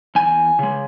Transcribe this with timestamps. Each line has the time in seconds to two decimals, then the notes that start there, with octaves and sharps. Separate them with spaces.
0.15 E2 G#5
0.59 C#3 G#3